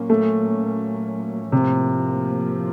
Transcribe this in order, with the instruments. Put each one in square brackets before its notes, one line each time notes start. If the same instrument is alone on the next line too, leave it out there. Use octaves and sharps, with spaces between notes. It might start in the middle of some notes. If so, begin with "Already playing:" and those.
Already playing: [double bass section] A#2 F#3 A#3 C#4
[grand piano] A3
[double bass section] A2 F3 A#3 [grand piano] C3